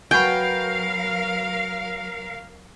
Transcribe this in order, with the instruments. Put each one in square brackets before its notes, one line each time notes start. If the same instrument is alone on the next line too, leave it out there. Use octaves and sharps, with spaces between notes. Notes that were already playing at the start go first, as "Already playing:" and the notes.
[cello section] F#3 A#4 F5 [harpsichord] B3 F#4 G#5 [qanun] G5